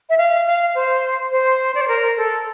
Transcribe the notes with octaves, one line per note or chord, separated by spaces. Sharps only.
E5
F5
F5
C5
C5
D5
C5
A#4
A4